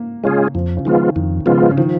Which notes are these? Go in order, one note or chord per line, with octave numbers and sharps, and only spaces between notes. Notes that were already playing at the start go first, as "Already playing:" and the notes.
Already playing: A#3
C#3 G#3 C#4 F4 G#4
F2 F3
C#3
D#3 F3 G#3 B3 F4
F2 D#3
C#3 F3 G#3 B3 F4
C#3
D#3 F3